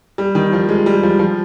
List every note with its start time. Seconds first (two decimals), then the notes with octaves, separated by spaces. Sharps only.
0.18 G3
0.35 D#3
0.53 F3
0.69 G#3
0.86 G3
1.03 F3
1.19 F3